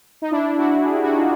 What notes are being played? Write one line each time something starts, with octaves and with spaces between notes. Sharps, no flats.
D#4
D4 E4
E4 F#4
G#4
G4
F#4
D#4 F4